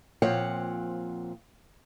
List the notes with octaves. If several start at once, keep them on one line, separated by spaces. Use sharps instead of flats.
A#2 F3 C4 C#5 F5 F#5